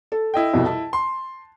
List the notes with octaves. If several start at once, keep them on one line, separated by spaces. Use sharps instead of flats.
A4
E4 D#5 G5
C2 F2 B2
A5
C6